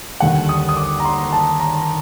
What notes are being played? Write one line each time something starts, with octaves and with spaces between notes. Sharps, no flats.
D#2 D3 G3 F#5
D#6
D#6
D6
A#5
C6
A5
A#5